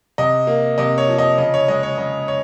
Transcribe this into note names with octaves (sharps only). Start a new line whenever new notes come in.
C3 D#5
A#3
C3 D#5
C#5
F3
D#5
C#3 D#5
C#5
G#3 D#5
C#5
C#3 D#5
C#5